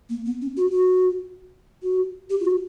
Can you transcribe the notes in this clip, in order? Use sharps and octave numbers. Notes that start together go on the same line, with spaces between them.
A#3
B3
C#4
F#4
F#4
F#4
G4
F4
F#4